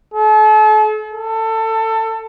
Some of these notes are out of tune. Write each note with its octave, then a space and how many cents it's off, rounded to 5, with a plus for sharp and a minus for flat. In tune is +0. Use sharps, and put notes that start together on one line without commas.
A4 -40
A4 +20